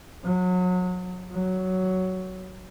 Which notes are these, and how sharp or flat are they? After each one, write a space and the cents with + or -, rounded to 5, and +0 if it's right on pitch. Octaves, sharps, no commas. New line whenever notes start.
F#3 -30
F#3 +10